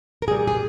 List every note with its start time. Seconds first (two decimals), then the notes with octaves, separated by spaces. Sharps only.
0.22 A#4
0.28 A#2 G3 G#4
0.48 G#4